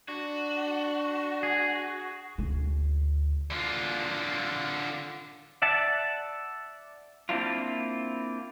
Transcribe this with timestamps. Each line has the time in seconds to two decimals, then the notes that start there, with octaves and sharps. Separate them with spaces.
0.08 D4 F#4
1.43 G#4
2.38 D2 C#3
3.50 D3 F4
5.62 D5 E5 F#5 A5
7.29 A#3 C4 D4 E4 F4